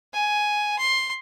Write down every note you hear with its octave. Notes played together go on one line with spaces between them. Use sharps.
G#5
C6